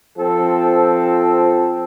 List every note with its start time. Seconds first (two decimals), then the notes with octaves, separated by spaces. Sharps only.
0.18 F3 C4 A4